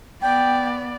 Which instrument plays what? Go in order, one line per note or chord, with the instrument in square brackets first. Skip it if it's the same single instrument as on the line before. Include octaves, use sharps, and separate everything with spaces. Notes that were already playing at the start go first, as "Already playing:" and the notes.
[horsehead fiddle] B3 D5 [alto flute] G5